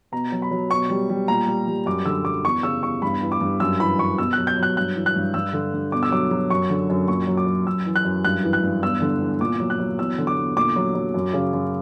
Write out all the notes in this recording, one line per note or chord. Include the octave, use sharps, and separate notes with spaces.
B2 A#5
F#3
B5
F#3
B2 C#6
G3
G3
A#2 A#5
G3
G3
F#2 D6
D3 E6
F#2 D6
E2 C#6
C#3 E6
E2 C#6
G2 B5
E3
D6
G2
F#2 E6
E3 B5
F#2 C#6
B2 E6
F#3 F#6
G6
F#3
F#6
G2 F#6
E3
F#6
G2
G2 E6
D3
G2
B2 D6
E6
F#3 D6
F#3
F#2 C#6
D3
F#2
A#2 C#6
F#3
D6
F#3
F#2 E6
E3
F#6
F#2
G2 F#6
E3
F#6
G2
E2 E6
D3
E2
A#2 D6
F#3
F#6
F#3
E2 E6
D3
D6
E2
A#2 D6
F#3
F#3
F#2
C#3
F#2